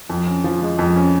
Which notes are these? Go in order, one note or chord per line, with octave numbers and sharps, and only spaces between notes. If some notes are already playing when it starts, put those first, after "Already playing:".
F2
C#4
F3
G#3
F2
C#4